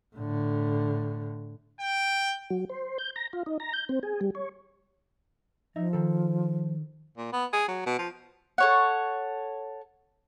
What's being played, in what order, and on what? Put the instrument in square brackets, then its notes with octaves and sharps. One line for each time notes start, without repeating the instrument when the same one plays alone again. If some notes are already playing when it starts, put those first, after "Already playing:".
[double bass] A2 D3
[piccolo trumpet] G5
[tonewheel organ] F#3
C5
G6
A#5
F4
D#4
A#5
G6
C4
G#4
G3
C#5
[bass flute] F3 [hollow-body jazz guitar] D#4 E5
[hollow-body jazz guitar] D#3 A4
[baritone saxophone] A#2
B3
G#4
F#3
B2
F3
[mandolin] A4 C#5 F#5